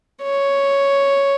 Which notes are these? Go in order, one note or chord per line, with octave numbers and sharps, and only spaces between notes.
C#5